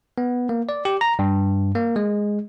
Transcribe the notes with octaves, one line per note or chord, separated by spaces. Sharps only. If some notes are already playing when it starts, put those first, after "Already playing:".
B3
A#3
D5
G4
A#5
G2
A#3
G#3